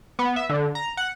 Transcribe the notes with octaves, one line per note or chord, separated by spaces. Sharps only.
B3
E5
D3
A#5
F#5